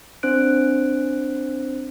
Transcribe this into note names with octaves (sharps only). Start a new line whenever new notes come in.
C4 D4 C5 F#6 D7